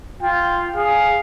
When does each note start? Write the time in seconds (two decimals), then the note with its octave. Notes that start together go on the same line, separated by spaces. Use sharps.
0.22 F4 G5
0.76 G#4 F5